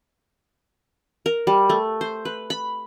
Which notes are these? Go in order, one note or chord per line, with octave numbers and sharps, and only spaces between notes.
A#4
G3
A3
C5
B4
B5